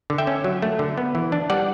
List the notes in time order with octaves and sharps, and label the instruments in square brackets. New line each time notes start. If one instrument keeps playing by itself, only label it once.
[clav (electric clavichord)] D3
E5 G5
C#4
F#3
A3
D3
B3
E3
D4
G3 D5 F#5